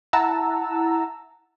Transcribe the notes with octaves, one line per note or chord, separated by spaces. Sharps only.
E4 F#5 A5 A#5 E6